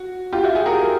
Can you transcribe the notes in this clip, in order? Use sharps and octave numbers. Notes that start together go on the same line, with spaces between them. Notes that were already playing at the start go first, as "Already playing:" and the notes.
Already playing: F#4
F4 G4
E4 F#4
F#4 G#4
G#4 A#4